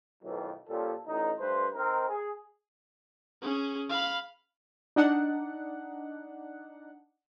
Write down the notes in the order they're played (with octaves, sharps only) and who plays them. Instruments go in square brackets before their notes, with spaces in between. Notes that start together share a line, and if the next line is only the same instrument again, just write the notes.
[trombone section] B1 F2 A2 D#3 E3 F#3
A#2 F3 G3 C#4 A4
A1 D2 A2 D#4
G2 A3 B4 C5
C4 D#4 A#4
G#4
[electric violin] C#4 G#4
F5 B5
[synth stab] D4 D#4 F#5